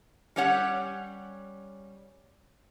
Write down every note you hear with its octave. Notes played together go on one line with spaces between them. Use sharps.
G3 C#4 G4 C#5 F#5